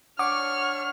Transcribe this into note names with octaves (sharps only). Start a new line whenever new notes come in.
D4 C#5 F#5 C#6 D6 F6